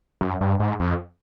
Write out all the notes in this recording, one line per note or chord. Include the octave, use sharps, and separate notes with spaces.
F#2
G2
G#2
F2